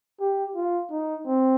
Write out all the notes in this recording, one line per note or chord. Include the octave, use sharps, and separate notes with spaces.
G4
F4
D#4
C4